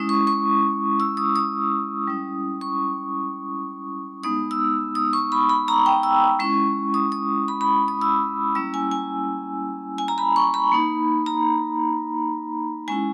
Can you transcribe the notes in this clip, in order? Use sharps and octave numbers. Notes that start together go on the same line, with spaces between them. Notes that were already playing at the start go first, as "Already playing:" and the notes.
Already playing: G#3 C#4 E4 D#6
C#6
C#6
E6
D#6
D#6
G3 C#4 E4
C#6
G#3 B3 D#4 D#6
E6
D#6
C#6
B5
B5
A#5
G5
E6
G#3 C#4 E4 C#6
D#6
D#6
B5
B5
D#6
E6
G3 A#3 C#4 E4 E6
G#5
G#5
G#5
A#5
B5
C#6
B5
A#3 D#4
A#5
G#3 C#4 E4 G#5